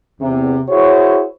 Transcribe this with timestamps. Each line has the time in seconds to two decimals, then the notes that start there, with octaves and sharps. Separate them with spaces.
0.20 E2 C3
0.68 E4 F#4 G#4 C5 C#5